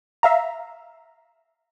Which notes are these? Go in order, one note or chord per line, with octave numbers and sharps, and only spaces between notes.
E5 F5 A#5